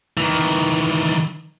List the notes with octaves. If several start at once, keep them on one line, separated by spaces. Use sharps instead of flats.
D#3 E3